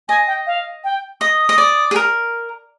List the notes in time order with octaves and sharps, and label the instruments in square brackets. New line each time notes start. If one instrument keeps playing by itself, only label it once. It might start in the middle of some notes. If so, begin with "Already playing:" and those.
[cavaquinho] D#5 [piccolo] G#5
[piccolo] G5
F5
G5
[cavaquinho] D#5 [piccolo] D#6
[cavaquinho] D#5
D5
G#4
A#4